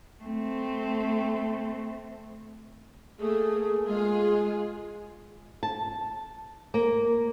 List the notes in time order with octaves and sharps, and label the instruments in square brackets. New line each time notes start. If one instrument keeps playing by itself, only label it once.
[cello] A3 C4
[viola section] A3 A#3 [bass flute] G#4
[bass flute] G#3 [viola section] F4 G#4
[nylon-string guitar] A5
A#3